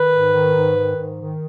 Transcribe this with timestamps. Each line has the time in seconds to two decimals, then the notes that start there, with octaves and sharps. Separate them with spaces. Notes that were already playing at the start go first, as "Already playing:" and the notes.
Already playing: D#3 B4
0.10 G#2
0.31 D#3
0.53 G#2
0.74 D#3
0.95 G#2
1.17 D#3